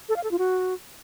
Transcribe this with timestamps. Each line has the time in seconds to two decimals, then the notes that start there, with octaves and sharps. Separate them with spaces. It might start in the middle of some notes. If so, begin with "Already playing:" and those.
0.09 A4
0.16 F5
0.24 A4
0.31 F4
0.38 F#4